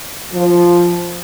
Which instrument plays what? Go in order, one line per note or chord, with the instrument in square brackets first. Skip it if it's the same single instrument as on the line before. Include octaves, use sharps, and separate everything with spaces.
[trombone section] F3